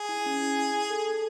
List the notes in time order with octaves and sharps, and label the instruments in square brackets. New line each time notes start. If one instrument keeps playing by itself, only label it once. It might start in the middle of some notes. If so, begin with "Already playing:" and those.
Already playing: [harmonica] G#4
[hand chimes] E4
C#4
E4
G#5
G#5
A4
A4